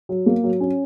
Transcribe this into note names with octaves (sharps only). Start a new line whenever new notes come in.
F#3
A#3
F#3
C#4